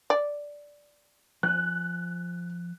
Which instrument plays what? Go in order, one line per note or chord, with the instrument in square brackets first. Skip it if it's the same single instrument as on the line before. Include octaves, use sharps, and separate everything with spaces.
[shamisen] D5
[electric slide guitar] F3 G#5 [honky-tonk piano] F#6